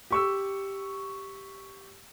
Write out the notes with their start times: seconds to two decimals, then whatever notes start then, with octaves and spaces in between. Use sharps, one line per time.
0.11 G4 C#6 E6